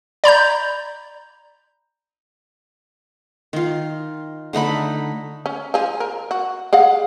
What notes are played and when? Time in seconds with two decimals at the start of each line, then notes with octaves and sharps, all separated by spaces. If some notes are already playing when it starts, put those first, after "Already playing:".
0.24 D5 A#5 B5 G6
3.53 D#3 F4
4.53 D3 A3 D#4 B5
5.46 C#4
5.74 F3 G#4
6.00 A#4
6.31 F#4
6.73 G#4 F5 F#5